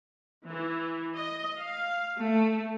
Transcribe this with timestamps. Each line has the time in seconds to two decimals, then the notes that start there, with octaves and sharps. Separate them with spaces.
0.45 E3
1.16 D#5
1.60 F5
2.22 A3